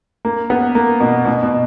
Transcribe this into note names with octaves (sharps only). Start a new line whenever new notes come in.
A#3
B3
A#3
B2
B2
B2